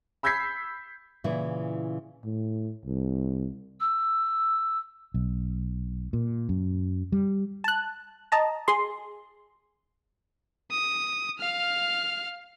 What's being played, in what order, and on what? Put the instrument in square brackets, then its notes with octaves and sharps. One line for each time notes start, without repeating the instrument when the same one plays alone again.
[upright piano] B5 E6 G6 G#6 B6 C7
[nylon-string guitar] A#2 C#3 E3 E4
[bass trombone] A2
C2
[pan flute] E6
[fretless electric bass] B1
A#2
F#2
G3
[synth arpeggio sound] A5 F#6
D#5 A5 A#5
G#4 C6
[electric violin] D#6
F5 F6